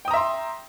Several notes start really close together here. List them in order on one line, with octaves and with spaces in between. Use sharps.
G5 D#6 A#5 E5 C6